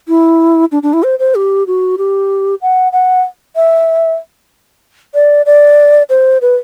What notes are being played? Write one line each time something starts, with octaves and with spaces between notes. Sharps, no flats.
E4
D4
D4
E4
C5
C5
G4
F#4
G4
F#5
F#5
E5
D5
D5
C5
B4